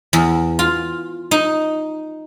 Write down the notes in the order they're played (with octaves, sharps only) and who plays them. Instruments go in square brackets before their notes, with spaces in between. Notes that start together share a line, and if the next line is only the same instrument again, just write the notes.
[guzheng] E2
F4
D#4